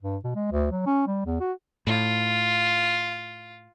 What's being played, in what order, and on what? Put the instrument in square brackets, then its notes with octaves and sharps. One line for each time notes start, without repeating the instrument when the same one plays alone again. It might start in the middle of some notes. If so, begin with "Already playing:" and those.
[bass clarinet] G2
B2
G#3
D2
F#3
C#4
G3
E2
F#4
[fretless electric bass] A2 [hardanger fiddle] F4